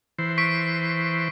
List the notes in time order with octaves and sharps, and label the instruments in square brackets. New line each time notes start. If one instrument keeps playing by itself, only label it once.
[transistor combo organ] E3 C5
[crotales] C#6 B6 D7